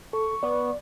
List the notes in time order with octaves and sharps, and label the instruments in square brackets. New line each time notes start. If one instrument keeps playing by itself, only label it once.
[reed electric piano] A4 [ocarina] C#6
[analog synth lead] B3 [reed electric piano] D5